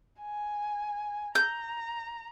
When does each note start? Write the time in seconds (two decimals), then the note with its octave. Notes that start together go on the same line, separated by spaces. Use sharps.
0.22 G#5
1.35 A#5 G6